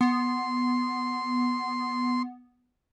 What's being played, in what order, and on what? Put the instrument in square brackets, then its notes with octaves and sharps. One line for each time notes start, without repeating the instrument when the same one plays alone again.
[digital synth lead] B3 [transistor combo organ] C6